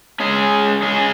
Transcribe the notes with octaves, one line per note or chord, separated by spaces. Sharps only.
G#3 C#4 G#4
G#3 C#4 G#4